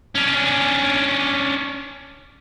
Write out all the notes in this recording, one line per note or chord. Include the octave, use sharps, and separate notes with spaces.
C#4 D4